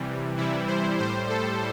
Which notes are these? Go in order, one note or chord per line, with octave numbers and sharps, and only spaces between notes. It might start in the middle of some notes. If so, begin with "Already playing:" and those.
Already playing: C3 E3 G3
C3 E3 G3 E4
C5
A2 G3 C5
A4